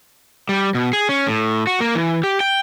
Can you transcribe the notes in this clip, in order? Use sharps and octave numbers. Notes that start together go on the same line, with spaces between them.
G3
B2
G#4
C#4
A2
F#4
A#3
E3
G4
G5